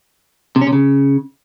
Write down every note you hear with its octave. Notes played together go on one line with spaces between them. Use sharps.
C3
C#4
C3
C#3